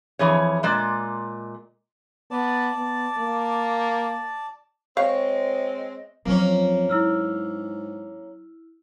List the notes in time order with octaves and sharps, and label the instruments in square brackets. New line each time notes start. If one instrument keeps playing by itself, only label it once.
[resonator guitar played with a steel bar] F2 E3 G#4 C#5
A#2 G#3 D5
[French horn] B3 [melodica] D5 A5
[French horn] B3
A#3
[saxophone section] G#3 C4 [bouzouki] C#5 [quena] D#5 [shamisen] F5
[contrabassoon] F2 [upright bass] F#3 F4 [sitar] A#3 C#4
[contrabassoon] G#2 [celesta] E4 E6 F6